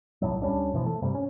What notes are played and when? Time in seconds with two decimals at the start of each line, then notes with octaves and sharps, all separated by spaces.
0.22 C2 A2 F#3
0.42 D2 G3 C#4 D4
0.73 G1 B2 E3 F3
0.86 A3
1.02 G2 C3 G3
1.14 C#4